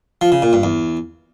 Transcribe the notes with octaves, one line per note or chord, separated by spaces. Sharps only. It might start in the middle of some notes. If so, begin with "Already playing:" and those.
F3
C#3
A#2
G2
E2